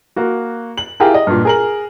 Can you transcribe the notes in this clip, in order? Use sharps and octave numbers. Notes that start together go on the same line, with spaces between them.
A#3 F#4
F#7
E4 F4 G4 G#4 A#4
D#5
G2 A#2
G#4 A#4 F#7